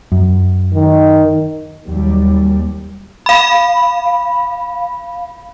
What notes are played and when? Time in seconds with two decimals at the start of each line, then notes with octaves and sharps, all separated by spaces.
0.12 F#2
0.74 D#3
1.85 D#2 F#3 G3
3.26 F5 B5